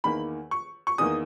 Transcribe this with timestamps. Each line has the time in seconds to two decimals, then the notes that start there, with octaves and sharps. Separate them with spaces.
0.04 E2 D#3 A#3 B5
0.51 C#6
0.87 C#6
0.98 E2 D#3 A#3 D#6